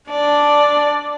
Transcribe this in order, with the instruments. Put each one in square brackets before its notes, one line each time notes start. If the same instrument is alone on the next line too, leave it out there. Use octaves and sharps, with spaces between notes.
[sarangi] D4 [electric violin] D5